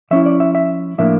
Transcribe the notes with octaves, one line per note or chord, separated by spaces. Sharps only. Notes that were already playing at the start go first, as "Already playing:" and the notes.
F3 C#4 E4 E5
D5
E5
E5
A2 F3 A#3 D4 E5